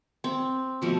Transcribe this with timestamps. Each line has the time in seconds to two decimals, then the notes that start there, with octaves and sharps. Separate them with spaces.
0.24 C4
0.82 B2 F3 A3